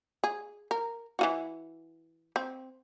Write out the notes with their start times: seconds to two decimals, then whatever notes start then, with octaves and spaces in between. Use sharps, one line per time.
0.24 G#4
0.71 A#4
1.19 E3 F4 F#4
2.36 C4